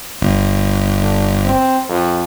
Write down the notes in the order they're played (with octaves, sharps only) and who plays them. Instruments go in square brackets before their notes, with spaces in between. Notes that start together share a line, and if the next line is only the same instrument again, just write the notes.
[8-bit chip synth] G1
[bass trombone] D3
C4
F2